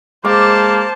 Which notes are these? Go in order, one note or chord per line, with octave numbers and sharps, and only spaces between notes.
G#3 A#3 C5 A5 D6